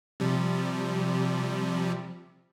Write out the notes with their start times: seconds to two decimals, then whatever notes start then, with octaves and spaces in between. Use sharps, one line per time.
0.20 C3 F3 G3